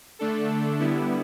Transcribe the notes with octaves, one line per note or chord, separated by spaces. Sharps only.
D3 A3 D4 A4
D3 G3 B3 E4